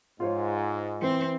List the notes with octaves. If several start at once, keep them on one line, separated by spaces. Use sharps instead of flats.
G#2 F4 C5 C#5
E3 C4